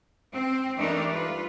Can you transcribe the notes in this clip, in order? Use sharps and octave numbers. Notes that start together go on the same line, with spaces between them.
C4
E3 G3 A3 D4 D#4 A#4
F4 B4